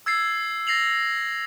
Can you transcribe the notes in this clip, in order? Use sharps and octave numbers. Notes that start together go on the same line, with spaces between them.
E6 G#6 A6 C7
A6 A#6 C7 F7 F#7